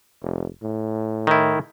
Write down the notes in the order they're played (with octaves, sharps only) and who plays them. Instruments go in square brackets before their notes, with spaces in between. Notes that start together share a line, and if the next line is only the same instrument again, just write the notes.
[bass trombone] F1
A2
[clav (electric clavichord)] D#3 E4